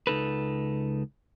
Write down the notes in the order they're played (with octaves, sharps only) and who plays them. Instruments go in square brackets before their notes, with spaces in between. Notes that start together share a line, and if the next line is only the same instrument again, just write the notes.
[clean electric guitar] C#2 D#4 A4 B4